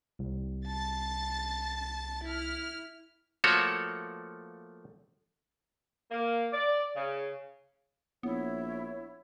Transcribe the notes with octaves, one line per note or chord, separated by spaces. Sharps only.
C2
A5 A6
E4 F6
F3 A3 A#3 F#4 A4 C#5
A#3
D5
C#3
A#1 B3 E4 C#5